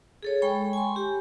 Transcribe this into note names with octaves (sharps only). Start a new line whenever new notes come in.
G#4 A4 C#5
G#3 G5 B5 C#6
G#5 C6
G4